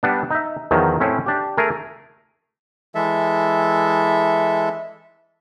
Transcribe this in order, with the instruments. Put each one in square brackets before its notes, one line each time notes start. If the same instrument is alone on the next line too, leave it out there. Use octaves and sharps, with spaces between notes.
[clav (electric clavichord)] G3 B3 D4
D#4 E5
E2 D#3 F3 F#3
A2 C4 C#4 E4
D4 G4
A3 G#4 A#4
[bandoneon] E3 G#3 A4 E5